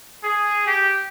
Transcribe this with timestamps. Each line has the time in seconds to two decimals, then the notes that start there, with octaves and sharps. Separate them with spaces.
0.23 G#4
0.67 G4